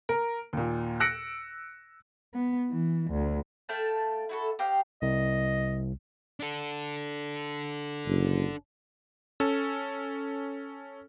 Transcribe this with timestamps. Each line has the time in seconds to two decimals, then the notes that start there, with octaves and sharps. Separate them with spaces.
0.09 A#4
0.53 D#2 A#2
1.00 E6 F#6 A#6 C#7 D7
2.34 B3
2.70 E3
3.11 D2
3.69 A3 F5 G5 A5
4.29 E4 F#4 A4
4.59 G4 C5 D#5 F5
5.02 C2 D#5
6.40 D4 A4
8.07 F#1
9.40 C#4 A4